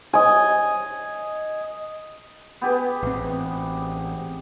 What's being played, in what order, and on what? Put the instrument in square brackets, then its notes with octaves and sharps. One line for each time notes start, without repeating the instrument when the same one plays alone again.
[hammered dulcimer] D#5 G#5
B3 G4 G#4
[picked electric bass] A1 C4